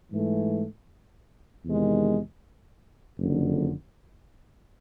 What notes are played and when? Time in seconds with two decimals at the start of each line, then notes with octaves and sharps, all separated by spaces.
0.11 G#2 E3 A3
1.65 E2 C3 D#3 G#3
3.18 F#1 F2 D3